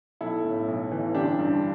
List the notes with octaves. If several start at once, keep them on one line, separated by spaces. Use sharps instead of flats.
B1 E4 A4
A2
B1
E3
G1 D4 G4
G2